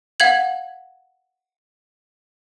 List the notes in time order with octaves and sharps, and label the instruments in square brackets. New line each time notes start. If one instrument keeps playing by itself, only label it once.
[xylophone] F5 F#5 G#6 F#7